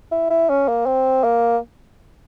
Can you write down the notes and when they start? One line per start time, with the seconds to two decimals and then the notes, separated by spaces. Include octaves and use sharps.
0.12 E4
0.30 E4
0.50 C#4
0.68 A#3
0.86 C4
1.24 A#3